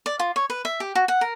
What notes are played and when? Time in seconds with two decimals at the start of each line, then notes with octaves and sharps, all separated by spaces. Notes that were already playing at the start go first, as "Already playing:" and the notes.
0.06 D5
0.19 F4
0.36 C#5
0.50 B4
0.65 E5
0.80 G4
0.95 F#4
1.08 F#5
1.21 A#4